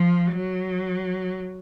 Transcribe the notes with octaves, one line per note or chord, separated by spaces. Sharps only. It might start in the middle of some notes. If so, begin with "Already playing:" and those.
Already playing: F3
F#3